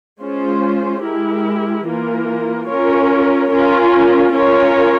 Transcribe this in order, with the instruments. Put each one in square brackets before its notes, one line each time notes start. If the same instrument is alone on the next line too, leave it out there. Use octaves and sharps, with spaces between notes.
[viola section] G#3 C#4 F4 C5
G#3 E4 G4 A#4
E3 A#3 F4 A#4
C#4 F4 A#4 C#5
C#4 F4 A#4
C#4 F4 A#4 C#5